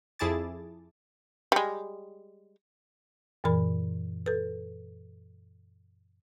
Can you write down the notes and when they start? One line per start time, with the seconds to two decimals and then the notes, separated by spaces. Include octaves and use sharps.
0.19 F2 E4 G#4 A5 D6 A6
1.52 G3 G#3
3.44 F#2 A#2 E3 A#4 B5
4.26 A4 B4